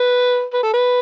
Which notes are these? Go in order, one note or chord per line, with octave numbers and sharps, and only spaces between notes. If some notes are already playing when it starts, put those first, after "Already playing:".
Already playing: B4
B4
A4
B4